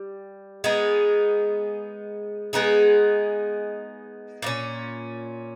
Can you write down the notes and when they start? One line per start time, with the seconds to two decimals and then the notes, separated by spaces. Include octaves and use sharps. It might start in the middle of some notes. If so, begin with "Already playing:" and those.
Already playing: G3
0.64 G#3 B3 D#4 G#4
2.53 G#3 B3 D#4 G#4
4.42 A#2 A#3 C#4